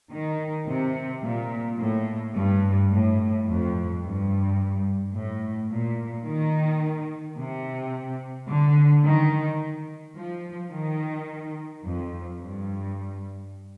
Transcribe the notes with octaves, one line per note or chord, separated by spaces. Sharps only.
D#3
C3
A#2
A2
G2
A2
F2
G2
A2
A#2
D#3
C3
D3
D#3
F3
D#3
F2
G2